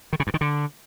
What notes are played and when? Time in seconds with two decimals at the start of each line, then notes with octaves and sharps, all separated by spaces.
0.13 D#3
0.20 C#3
0.27 G2
0.34 D#3
0.41 D3